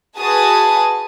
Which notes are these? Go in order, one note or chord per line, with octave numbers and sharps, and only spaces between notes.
F#4 G#4 B4 G#5 A5 D#6